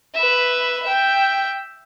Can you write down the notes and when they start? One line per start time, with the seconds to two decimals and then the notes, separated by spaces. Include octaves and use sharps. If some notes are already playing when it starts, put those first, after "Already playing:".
0.15 B4 E5
0.83 E5 G5